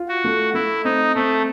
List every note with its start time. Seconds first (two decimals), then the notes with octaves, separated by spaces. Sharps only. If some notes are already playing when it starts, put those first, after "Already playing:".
Already playing: F4
0.09 F#4
0.24 A3
0.54 A3 E4
0.85 C4 D#4
1.15 A3 C4